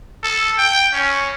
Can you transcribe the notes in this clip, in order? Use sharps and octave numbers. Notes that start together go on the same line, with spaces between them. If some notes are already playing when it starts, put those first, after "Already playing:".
A4
G5
C#4